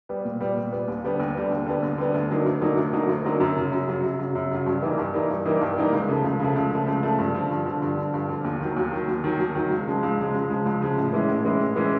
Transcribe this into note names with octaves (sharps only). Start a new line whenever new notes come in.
G3 B3
A#2
G3 B3
A#2
G3 B3
D#2
D3 G3 B3
D#2
D3 G3 B3
D#2
D3 G3 B3
D#2
D3 G3 B3
D2
D3 F#3 A#3 D#4
D2
D3 F#3 A#3 D#4
D2
D3 F#3 A#3 D#4
D2
D3 F#3 A#3 D#4
F#2
C#3 F#3
F#2
C#3 F#3
F#2
C#3 F#3
F#2
C#3 F#3
G2
E3 G3 A#3 D#4
G2
E3 G3 A#3 D#4
G2
E3 G3 A#3 D#4
G2
E3 G3 A#3 D#4
C#2
C#3 F3 A3
C#2
C#3 F3 A3
C#2
C#3 F3 A3
C#2
C#3 F3 A3
G2
D3 F3
G2
D3 F3
G2
D3 F3
G2
D3 F3
D#2
D#3 F#3
D#2
D#3 F#3
D#2
D#3 F#3
D#2
D#3 F#3
C#2
C#3 F3 G#3
C#2
C#3 F3 G#3
C#2
C#3 F3 G#3
C#2
C#3 F3 G#3
A2
E3 G#3 C#4 E4
A2
E3 G#3 C#4 E4
A2
E3 G#3 C#4 E4